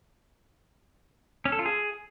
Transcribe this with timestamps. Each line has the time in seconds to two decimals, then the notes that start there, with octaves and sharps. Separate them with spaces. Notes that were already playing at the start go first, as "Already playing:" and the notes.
1.45 C#4
1.52 A4
1.59 F4
1.66 G#4